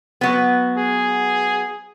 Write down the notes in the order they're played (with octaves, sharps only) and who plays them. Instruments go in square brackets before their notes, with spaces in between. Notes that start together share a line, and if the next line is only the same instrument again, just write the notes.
[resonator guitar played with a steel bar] F#3 B3
[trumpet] G#4